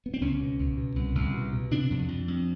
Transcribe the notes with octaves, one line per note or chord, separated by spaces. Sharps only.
B3
C4
C#2 C#4
B2
C#2
B2
C2
C2
B2
B2
C3 D4
F2
F2
F2